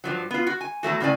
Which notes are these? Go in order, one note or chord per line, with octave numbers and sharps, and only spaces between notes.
G2 F3 F#3
B3 F4
F#4
G#5
E2 F#3 A3 F#4
A2 C#3 C#4 D5 G#5